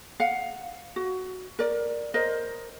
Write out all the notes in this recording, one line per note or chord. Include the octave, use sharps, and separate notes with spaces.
F5 F#5
F#4
A#4 D5
A#4 C5 D#5